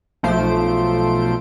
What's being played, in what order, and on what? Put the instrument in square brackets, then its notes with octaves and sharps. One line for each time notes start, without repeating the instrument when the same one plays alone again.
[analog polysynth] B1 F3 A3 C5 D7